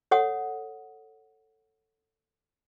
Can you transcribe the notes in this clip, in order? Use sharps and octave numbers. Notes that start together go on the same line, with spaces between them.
A4 C#5 F#5 D#6